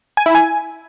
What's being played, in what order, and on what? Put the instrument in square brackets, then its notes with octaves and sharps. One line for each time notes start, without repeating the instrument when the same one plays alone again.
[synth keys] G#5
E4
G#5